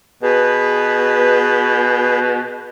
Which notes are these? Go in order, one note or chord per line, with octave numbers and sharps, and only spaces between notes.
B2 G#4 B4